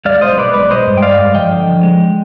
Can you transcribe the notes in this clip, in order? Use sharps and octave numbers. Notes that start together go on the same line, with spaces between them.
G#3 D5 F5
B1 C5 D#5
G#3 B4 D5
B1 B4 D5
G#3 C5 D#5
G2
G5
G#3 D5 F5
G2
F3 D#5 G5
D3
F3
G#3